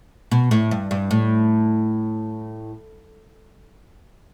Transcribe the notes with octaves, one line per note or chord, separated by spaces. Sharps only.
B2
A2
G2
G2
A2